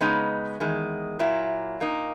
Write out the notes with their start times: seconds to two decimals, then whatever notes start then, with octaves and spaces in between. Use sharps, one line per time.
0.01 C#3 G#3 B3 D#4
0.60 E2 D#3 G#3
1.19 A#2 F#3 A#3 E4
1.80 A#2 A#3 D#4